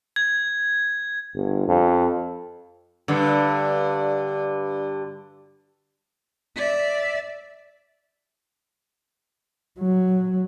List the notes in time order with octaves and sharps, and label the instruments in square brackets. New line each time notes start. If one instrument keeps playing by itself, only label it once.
[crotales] G#6
[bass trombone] G1
F2
[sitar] G2 D3
[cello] D5 E5
[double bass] F#3